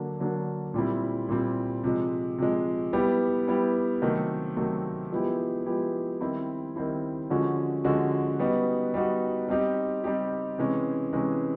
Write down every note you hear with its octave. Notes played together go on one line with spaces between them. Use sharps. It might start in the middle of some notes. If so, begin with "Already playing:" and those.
Already playing: D3 F#3 A#3 D4
D3 F#3 A#3 D4
A#2 G3 C4 E4
A#2 G3 C4 E4
C3 F3 G#3
C3 F3 G#3
G3 B3 E4 G4
G3 B3 E4 G4
C3 D#3 F#3 A3 C4
C3 D#3 F#3 A3 C4
F3 G#3 B3 E4 G4
F3 G#3 B3 E4 G4
D#3 G3 C4 E4
D#3 G3 C4 E4
D3 F3 G#3 C#4 F#4
D3 F3 G#3 C#4 F#4
G3 B3 D#4 F#4
G3 B3 D#4 F#4
G3 C4 D#4 G4
G3 C4 D#4 G4
C3 E3 G#3 C#4
C3 E3 G#3 C#4